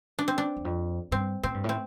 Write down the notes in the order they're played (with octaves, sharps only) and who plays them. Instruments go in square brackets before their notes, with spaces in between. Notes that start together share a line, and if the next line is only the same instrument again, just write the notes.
[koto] D4
C4
D4
[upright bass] E2
F2
[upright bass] G2 [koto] C4
[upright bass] A2 [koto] C4
[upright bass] G2
A2
[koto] C4